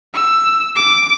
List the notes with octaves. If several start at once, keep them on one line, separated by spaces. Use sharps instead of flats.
E6
D6